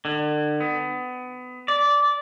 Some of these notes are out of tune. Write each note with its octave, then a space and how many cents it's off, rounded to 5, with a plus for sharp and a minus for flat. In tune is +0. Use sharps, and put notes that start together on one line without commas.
D3 +35
B3 +25
D5 -15